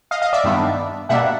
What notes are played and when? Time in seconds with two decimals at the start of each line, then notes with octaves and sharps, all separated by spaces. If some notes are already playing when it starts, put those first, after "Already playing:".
0.11 D#5 F5
0.22 D#5 F5
0.33 D5 E5
0.44 G2 D#3 G3 B3 D4
1.09 B2 G3 A#3 D4 E5 F#5